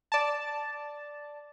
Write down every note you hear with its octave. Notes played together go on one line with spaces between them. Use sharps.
D5 A5